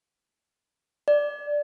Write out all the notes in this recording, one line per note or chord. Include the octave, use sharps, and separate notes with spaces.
D5